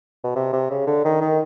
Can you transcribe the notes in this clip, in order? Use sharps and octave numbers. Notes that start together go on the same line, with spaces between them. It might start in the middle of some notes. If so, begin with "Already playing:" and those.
B2
C3
C3
C#3
D3
D#3
D#3